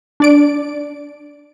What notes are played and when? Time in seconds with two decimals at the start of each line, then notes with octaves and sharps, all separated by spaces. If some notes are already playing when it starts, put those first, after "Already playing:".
0.20 D4 D5 D7